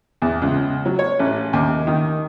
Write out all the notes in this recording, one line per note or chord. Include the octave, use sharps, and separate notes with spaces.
E2
C#2
F#3
C#5
A1
D#2
D#3